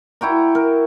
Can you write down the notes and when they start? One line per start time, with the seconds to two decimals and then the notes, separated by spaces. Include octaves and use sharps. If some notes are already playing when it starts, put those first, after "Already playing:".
0.21 E4 F#4 G5 A#5
0.55 A#4